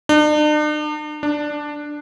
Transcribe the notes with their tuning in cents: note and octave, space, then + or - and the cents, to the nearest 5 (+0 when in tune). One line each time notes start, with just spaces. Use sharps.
D4 +45
D4 +5